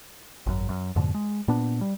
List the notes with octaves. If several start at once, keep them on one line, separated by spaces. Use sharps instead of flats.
G#1 F#2
F#2
F2 G#2 B2 D3
G#3
A#2 B3 D4
G3